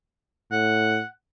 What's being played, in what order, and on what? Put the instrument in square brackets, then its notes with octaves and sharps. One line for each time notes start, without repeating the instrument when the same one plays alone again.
[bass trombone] A2 [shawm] F#5